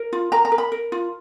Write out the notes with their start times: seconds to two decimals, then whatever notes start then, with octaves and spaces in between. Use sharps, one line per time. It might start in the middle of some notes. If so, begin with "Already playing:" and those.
Already playing: A#4
0.13 F4
0.32 A#4 A#5
0.45 A#5
0.52 A#4
0.58 B5
0.72 A#4
0.92 F4